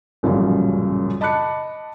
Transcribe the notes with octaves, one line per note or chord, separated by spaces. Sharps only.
A1 F#2 A#2 C#3 F3 G3
D#5 A5 B5 D6 F#6 C#7